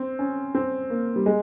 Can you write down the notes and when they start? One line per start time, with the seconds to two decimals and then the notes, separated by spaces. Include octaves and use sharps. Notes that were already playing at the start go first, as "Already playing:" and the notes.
Already playing: C4
0.19 C#4
0.55 C4
0.90 A#3
1.16 G3
1.26 G#3